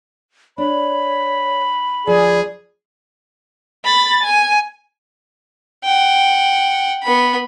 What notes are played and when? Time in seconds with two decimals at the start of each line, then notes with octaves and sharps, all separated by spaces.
0.58 D4 C#5 B5
2.07 D2 F3 G#4 D5
3.84 B5 A6
4.23 G#5
5.84 F#5 G5
7.03 B3 B5